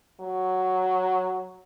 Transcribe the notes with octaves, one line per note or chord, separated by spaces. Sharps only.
F#3